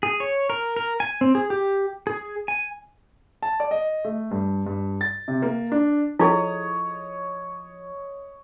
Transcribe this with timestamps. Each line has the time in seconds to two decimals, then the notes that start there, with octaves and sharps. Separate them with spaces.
0.03 G#4
0.20 C#5
0.50 A#4
0.76 A#4
1.00 G#5
1.21 C4
1.35 G#4
1.50 G4
2.07 G#4
2.48 G#5
3.42 A5
3.60 D5
3.71 D#5
4.05 A3
4.31 G2
4.66 G2
5.01 A6
5.28 C3
5.42 A#3
5.72 D4
6.19 F3 E4 G#4 A4 C#5 D#5